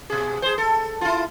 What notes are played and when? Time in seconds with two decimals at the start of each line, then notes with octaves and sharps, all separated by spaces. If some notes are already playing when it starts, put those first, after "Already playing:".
0.10 B2 G#4
0.42 G#4 C5
0.58 A4
1.01 E4 F4